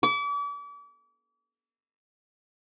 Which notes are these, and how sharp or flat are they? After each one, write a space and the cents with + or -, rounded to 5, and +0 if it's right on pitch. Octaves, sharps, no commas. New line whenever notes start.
D6 -40